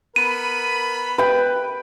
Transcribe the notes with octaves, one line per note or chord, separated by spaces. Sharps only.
B3 A#4 B5 D#7
B4 G5